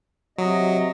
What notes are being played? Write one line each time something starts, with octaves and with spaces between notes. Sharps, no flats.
C3 F#3 D#5